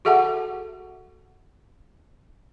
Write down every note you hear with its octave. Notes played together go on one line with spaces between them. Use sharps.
F#4 G#4 A4 E5 F#5 A5